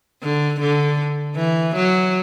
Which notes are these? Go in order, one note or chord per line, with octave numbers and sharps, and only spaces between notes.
D3
D3
E3
F#3